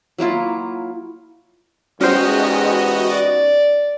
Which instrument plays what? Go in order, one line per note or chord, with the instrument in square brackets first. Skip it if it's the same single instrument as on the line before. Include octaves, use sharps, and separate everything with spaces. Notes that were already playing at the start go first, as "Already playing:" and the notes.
[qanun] F#3 A#3 E4 F4
[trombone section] E2 G#2 [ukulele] C#4 C5 [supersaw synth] F#4 D#5 [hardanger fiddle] G4
[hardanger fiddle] D5